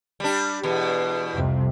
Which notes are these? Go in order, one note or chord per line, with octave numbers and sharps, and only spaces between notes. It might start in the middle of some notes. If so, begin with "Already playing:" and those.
G3 D4
E2 B2
C2 F2 C3